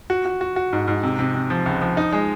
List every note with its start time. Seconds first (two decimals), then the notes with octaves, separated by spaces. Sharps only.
0.10 F#4
0.25 F#4
0.41 F#4
0.56 F#4
0.73 G#2
0.88 G#2
1.03 C3
1.19 C3
1.34 C3
1.50 F3
1.66 C#2
1.81 F3
1.97 D#4
2.13 G#3